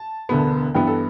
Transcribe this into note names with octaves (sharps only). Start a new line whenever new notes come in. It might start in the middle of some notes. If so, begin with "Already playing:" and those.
Already playing: A5
E1 D2 D3 B3
G2 E3 B3 G5
A4